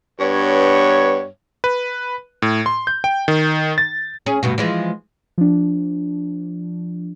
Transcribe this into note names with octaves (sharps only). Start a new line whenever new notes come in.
G2 B3 C#5
B4
A2
C6
G6
G5
D#3
A6
C#4 G#4
D2 G2 B2
E3 F3 G#3
F3 D4